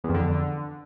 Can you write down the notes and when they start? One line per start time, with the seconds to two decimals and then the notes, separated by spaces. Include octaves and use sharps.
0.04 E2
0.09 F2
0.14 D3